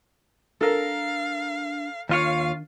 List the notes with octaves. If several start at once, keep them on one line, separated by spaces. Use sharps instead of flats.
D4 A4 A#4 F5
D#2 D#3 D4 F4 C#5 F5